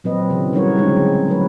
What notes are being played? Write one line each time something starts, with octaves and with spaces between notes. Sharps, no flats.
A#2 F#3 C4 B4 D#5
C#3 E3
E3 G3 D#4 F#4 A#4 C#5
D3 F#3 G#3 C4 C#4 D#4
F#3 A3 C4 B4 C#5